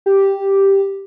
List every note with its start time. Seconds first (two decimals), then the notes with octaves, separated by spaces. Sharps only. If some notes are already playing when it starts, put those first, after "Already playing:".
0.06 G4